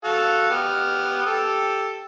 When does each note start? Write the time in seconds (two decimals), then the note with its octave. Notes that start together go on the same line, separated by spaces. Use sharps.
0.04 F#4 A4 F5
0.50 B3 G4 F6
1.26 G4 A4